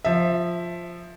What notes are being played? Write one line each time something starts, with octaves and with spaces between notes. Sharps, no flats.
F3 E5